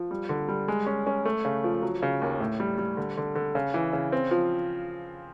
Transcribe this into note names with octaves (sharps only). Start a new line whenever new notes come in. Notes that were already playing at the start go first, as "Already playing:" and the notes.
Already playing: F3
G3
D3
G3
G#3
C#4
C#4
A3
C#3
F3
F#3
C#3
D#2
A2
G3
G3
D3
D3
D3
C#3
E3
C#3
C4
F3